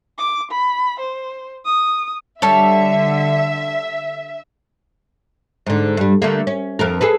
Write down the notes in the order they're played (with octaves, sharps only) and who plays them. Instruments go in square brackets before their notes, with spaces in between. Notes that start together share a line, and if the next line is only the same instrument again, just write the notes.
[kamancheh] D6
B5
C5
D#6
[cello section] D3 [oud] G3 [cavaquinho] A4 C#5 [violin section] E5
[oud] G#2 D3
G2 G3
D3 A3 A#3
C#4
F2 A4 A#4
G#4 A4 B4